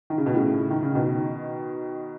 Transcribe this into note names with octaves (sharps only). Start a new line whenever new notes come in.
D#3
C#3
B2
A2 C#3
D#3
C#3
B2 D#3